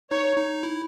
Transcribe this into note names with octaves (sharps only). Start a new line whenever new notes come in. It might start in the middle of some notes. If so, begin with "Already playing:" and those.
D#4 C#5
D#4
E4